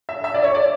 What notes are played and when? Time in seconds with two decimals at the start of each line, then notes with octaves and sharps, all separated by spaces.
0.09 E5
0.24 E5
0.34 D5
0.44 C#5
0.54 D5